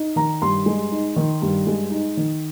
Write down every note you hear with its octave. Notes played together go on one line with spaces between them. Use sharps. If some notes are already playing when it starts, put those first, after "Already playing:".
Already playing: D#4
D#3 A#5
G2 C6
G#3
D#4
D#3
G2
G#3
D#4
D#3